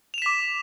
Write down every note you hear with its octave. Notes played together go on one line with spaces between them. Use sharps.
D6 B6 E7 F7